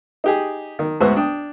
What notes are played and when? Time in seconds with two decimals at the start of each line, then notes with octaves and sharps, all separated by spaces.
0.24 D#4 G4 G#4
0.79 D#3
1.00 D2 G#2 B3 F#4 C5 E5
1.16 D4 G5 D#6